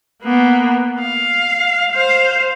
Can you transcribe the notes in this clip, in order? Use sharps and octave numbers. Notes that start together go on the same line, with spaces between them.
A#3 B3
F5
C5 F5